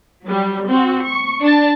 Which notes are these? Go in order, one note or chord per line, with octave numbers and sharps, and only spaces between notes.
F#3 G3
C4 F#4
C#6
D4 A5